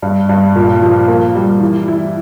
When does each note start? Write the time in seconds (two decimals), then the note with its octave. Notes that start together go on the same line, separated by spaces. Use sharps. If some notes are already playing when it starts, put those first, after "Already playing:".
0.02 G2
0.29 G2
0.56 A#2
0.82 F3
1.08 A#3
1.35 G3
1.61 E3
1.88 E4